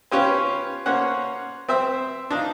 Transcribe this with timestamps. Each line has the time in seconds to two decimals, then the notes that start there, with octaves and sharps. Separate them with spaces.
0.11 C#4 F4 G4 B4 C5
0.86 A#3 C#4 C5 F#5
1.69 C4 C5 E5
2.31 D4 D#4 F4